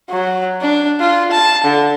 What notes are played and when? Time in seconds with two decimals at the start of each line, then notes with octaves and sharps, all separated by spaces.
0.10 F#3
0.62 D4
1.00 F4
1.31 A5
1.64 D3